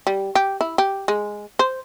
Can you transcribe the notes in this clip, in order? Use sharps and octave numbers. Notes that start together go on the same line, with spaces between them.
G3
G4
E4
G4
G#3
C5